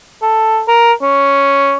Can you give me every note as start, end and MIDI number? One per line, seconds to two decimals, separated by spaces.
0.22 0.62 69
0.68 0.93 70
1.02 1.78 61